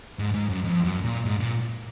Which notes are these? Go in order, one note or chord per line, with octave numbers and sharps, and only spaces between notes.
G#2
G#2
F#2
F2
F#2
A#2
G#2
A#2